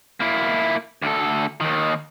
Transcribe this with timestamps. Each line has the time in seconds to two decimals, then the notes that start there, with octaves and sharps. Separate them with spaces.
0.20 A#3 E4
1.02 D2 A4
1.61 D#2 D#3